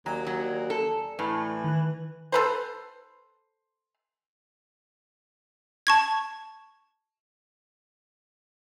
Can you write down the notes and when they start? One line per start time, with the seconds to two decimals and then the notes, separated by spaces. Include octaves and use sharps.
0.06 D#2 F#3 D5 G#5 A#5
0.27 F#3
0.70 A4
1.19 A2 E3
1.64 D#3 F#6
2.32 A4 B4 C5
5.87 A5 C#6 G#6